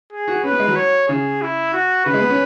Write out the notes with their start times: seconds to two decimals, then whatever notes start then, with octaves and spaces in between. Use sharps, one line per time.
0.12 G#4
0.28 F#4
0.44 C#4 B4
0.52 B3
0.60 G#3
0.68 F#3
0.76 C#5
1.08 C#3 G#4
1.42 E4
1.73 F#4
2.05 C#3 B4
2.14 G#3
2.22 B3
2.30 C#4